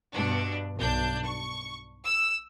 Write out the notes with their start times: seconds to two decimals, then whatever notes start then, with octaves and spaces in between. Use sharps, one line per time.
0.14 G2 B2 D4
0.76 B1 D4 G6
1.24 C#6
2.04 E6